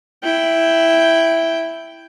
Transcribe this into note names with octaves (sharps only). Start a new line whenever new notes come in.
E4 G5